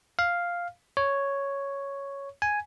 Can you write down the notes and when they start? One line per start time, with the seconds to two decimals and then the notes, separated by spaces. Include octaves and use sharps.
0.19 F5
0.97 C#5
2.42 G#5